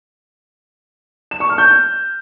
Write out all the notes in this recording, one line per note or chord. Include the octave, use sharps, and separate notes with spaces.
E7
C#6
F6
G6